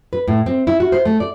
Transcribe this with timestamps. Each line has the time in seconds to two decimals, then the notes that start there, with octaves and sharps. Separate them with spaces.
0.13 B4
0.28 A2
0.46 C4
0.67 E4
0.80 F#4
0.92 C5
1.05 A3
1.20 D5